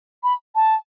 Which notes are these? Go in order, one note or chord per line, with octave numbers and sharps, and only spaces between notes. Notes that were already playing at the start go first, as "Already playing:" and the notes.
B5
A5